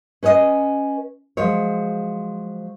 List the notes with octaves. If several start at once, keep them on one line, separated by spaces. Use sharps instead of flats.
C#4 B4 C#5 D#5
F3 F#3 G#3 C5 C#5